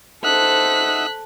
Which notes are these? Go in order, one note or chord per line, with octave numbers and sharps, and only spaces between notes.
D#4 A4 C5 E5 F#5 F#6 B6